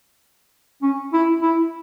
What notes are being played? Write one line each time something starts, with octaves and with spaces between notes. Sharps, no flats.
C#4
E4
E4